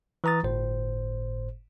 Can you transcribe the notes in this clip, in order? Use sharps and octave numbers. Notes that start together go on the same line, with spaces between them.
E3 B4 A#5 D#6 A6
G1 A2 C5